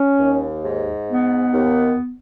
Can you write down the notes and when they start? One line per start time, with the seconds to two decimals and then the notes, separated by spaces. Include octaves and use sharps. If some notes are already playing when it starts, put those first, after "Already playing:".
Already playing: C#4
0.20 D#2
0.65 G#2
1.10 B3
1.53 D#2